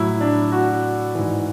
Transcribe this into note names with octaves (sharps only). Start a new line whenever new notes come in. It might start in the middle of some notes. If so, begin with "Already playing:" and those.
Already playing: A2 F#3 E4
D4
F#4
G#2 E3